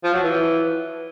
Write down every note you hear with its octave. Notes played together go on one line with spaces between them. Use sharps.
F3
F#3
E3